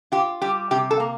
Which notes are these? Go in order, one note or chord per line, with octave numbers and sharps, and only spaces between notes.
F4 G4
G3 G4
C3 G4
A4
A#3